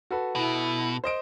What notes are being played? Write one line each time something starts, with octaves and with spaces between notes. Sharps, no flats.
F#4 A4 B4
B2 E4
C5 D#5 D7